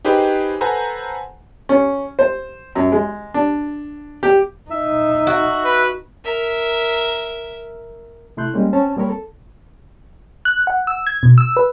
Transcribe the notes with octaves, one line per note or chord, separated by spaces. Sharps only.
D#4 G4 G#4 B4 C5
A4 B4 C5 F#5 G#5 A#5
C#4
C5
F#2
G#3
D4
G4
D#4 E5
F#4
B4
A#4 E5
C3 A3 E4 C6 F#6 G6
G3 G#3 A#3 C#4
C4 C#4 C5 C#5 A5
G3 A#3 C4 A#4 C#5 B5
A4
F#6
F#5
E6
G#6
B2
E6
B4